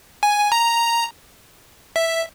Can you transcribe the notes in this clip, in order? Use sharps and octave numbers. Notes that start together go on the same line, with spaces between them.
G#5
A#5
E5